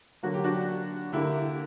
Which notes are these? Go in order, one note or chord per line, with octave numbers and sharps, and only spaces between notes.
D3 F#3 A#3 F#4
G4
D4 F#4
D3 A#3 E4 G4